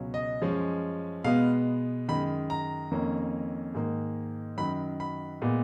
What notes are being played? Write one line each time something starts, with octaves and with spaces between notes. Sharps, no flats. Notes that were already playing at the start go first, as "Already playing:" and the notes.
Already playing: C#2 B2 F#3 C#4
D#5
F#2 F3 G#3 C#4
B2 G#3 B3 F5
F#2 D#3 G#3 B5
A#5
F2 D#3 A#3 C#4
G#2 D#3 A#3
F#2 D#3 F#3 B5
B5
A#2 G#3 B3